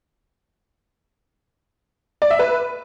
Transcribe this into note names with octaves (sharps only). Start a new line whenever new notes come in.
D5
E5
B4